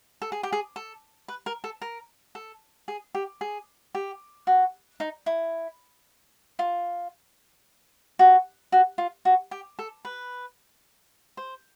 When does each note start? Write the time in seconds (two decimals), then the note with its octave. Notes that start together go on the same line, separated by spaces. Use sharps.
0.22 A4
0.32 G#4
0.43 G4
0.52 G#4
0.76 A4
1.28 B4
1.46 A#4
1.64 A4
1.82 A#4
2.35 A4
2.88 G#4
3.15 G4
3.41 G#4
3.95 G4
4.47 F#4
5.00 D#4
5.26 E4
6.59 F4
8.19 F#4
8.72 F#4
8.98 F4
9.25 F#4
9.51 G4
9.79 A4
10.05 B4
11.37 C5